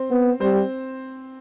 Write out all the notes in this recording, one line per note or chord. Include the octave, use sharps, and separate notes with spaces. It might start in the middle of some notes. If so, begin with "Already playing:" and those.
Already playing: C4 C5
B3
G3 C4 C5